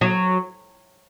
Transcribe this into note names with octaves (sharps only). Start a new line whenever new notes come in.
F#3